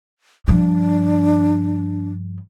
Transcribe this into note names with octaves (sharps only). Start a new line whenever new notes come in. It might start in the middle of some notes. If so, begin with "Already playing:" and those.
G2 F3 D4